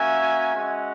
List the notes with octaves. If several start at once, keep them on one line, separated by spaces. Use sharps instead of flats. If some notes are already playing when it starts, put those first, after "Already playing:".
Already playing: A#3 C#4 F#4 E5 G#5
G#3 C#4 F#4